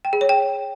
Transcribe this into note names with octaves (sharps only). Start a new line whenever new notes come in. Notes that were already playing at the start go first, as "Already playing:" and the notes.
G5
G#4
C#5
G5